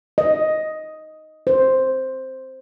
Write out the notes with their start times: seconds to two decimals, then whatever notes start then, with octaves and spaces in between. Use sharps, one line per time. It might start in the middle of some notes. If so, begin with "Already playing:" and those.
0.18 D#5
1.47 C5